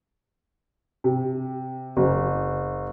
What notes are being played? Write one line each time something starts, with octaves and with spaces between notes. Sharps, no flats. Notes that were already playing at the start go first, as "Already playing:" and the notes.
C3
F#1